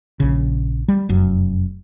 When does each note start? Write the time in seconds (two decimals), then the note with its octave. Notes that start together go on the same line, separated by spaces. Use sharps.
0.20 A#1 C#3
0.88 G3
1.09 F1 F#2